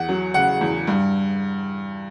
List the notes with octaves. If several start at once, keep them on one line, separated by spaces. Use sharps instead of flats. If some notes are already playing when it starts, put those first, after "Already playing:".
Already playing: E2 F#5
F#3
C#3 F#5
E2
G2